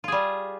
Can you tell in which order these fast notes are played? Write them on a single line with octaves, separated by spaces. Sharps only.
F4 G#4 G3